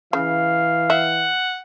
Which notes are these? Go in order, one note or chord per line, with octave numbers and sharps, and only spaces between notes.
C#3 E3 F5
E5 F#5